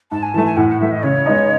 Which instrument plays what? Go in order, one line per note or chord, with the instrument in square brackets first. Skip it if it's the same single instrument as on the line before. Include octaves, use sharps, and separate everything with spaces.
[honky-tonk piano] G#2 [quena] A5
[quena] G#5
[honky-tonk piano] E3 A3 [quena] A5
[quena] G#5
[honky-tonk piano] A2 [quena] F#5
[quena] F#5
[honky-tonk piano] E3 A3 [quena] E5
[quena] D#5
[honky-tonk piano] C#3 [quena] C#5
[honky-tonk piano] G#3 B3 D#4